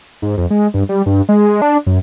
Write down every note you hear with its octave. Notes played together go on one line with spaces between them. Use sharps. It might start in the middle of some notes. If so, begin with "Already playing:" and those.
G#2
F2
G#3
G2
G3
G2
G#3
D4
F#2